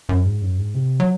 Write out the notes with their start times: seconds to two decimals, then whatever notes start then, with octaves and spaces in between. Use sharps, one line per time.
0.09 F#2
0.26 G#2
0.42 F#2
0.58 G#2
0.75 C3
1.00 F#3